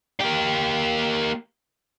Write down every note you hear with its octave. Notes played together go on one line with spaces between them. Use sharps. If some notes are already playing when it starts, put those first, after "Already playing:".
A#3 G4